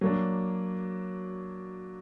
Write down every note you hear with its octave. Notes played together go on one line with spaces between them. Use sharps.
F#3 A#3 D4